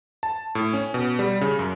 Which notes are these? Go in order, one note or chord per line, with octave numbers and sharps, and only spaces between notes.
A5
A2
C#4
B2
G3
C#3
F#2